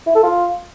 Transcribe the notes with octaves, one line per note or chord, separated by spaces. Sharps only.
E4
A4
F4